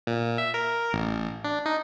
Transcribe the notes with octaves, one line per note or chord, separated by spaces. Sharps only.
A#2
E5
A#4
A1
D4
D#4